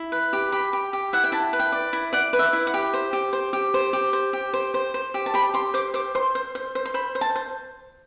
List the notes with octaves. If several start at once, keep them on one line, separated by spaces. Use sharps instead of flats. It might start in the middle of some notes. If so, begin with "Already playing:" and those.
Already playing: E4
B4
G4
G4 B5
G4
G4
E4 F#5
G5
E4 A5
B4
G5
D5
E4
D5 F#5
B4
E5
E4
F#5
G4
C5
G4
C5
G4
C5
G4
C5
G4
C5
C5
C5
G4
A5
G4 B5
G4 C6
C5 D6
C5 D6
C5 C6
C5
C5
C5
C6
C5 B5
C5
A5
C5